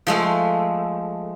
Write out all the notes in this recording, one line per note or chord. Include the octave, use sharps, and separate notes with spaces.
F3 G#3 A3